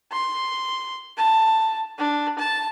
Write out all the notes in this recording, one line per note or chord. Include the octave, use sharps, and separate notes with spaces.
C6
A5
D4
A5